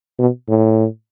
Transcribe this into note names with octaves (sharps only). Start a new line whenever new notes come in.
B2
A2